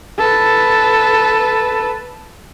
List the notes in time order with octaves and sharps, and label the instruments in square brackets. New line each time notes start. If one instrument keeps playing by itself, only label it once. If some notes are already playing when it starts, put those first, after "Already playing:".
[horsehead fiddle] A4 B4